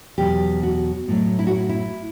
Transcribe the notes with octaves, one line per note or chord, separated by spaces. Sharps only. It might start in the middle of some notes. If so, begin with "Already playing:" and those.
E2 B2 F#3 G4
F#4
A2 F#3
E4
F#4
E4
E4